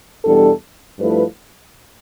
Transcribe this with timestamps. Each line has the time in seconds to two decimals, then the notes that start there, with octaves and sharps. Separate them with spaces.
0.25 E2 B2 G3 D4 A4
0.98 G2 F3 A3 E4 B4